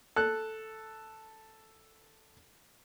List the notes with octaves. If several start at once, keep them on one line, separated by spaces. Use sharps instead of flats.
A4 F#6